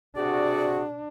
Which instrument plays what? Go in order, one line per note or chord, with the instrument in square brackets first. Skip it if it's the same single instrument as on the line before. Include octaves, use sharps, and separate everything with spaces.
[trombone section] C3 F#4 [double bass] D4 [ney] G#4 [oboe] D5